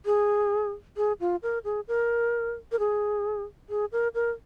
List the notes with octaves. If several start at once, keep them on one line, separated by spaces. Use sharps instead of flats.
G#4
G#4
F4
A#4
G#4
A#4
A#4
G#4
G#4
A#4
A#4